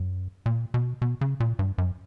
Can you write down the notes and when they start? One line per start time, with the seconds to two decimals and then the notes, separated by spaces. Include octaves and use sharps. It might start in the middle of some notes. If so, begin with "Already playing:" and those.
Already playing: F#2
0.46 A#2
0.74 B2
1.02 B2
1.21 C#3
1.40 A#2
1.59 G2
1.78 F#2